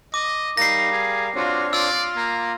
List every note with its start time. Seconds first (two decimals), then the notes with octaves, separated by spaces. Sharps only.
0.14 D#5 D6
0.57 G3 D#4 A#4 F5 A#6 C7
0.92 G#4
1.35 C4 D4 F4 F#4 C#5
1.73 F4 D5 E6
2.16 A#3 A#5